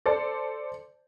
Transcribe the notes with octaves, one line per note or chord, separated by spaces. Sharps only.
A4 C5 D5